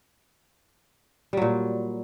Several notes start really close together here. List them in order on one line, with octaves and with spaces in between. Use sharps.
G3 F#3 A#2